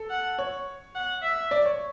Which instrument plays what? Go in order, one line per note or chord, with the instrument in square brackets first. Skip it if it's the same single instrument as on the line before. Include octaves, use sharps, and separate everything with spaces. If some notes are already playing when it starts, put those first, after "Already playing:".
Already playing: [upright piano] A4
[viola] F#5
[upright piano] C#5
[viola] F#5
E5
[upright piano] D5
C#5